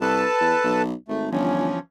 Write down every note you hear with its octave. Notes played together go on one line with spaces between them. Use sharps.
C2 A4 B4 A5
E2
B1
G#1 A3
G1 E3 F3 C#4